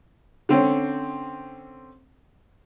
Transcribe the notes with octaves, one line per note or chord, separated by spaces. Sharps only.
D3 C4 C#4